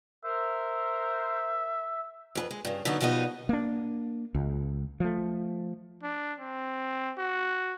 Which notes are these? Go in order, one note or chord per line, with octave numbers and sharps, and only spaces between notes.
A#4 C5 E5
F2 G4 B4
G#3
G2 C#3
D3 F#3 B3 D#4 F#4
B2 F3 G3 B3 D#4 D#5
A#3 D4
C#2
F3 A3
D4
C4
F#4